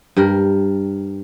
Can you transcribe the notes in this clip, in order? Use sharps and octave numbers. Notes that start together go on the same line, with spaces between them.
G2 G3 A#4